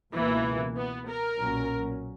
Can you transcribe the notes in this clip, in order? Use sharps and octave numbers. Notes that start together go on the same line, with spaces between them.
C#2 B2 E3 A#3
B3
A#4
B1 A#2 F#3 C#4